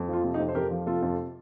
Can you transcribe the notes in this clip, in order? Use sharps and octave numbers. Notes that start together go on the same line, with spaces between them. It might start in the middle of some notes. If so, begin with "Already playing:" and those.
Already playing: F2
F3 F4
C3
D#4 G4
F2
C5
F2 G4 A#4
F3
C3 F4 A4
F2